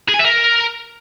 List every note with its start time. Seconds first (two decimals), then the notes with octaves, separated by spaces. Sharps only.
0.09 G#4
0.14 G#5
0.19 E5
0.25 A#4